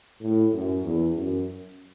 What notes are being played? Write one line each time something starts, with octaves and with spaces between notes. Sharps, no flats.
A2
F#2
E2
F#2